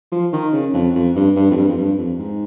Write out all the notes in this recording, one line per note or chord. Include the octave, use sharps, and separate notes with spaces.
F3
D#3
C#3
F2
F2
G2
G2
F2
G2
F2
G2
F2
G#2